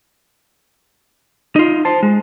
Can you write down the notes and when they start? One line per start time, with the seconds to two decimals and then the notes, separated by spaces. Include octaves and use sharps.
1.56 D#4 F4
1.85 C5 A5
2.03 G#3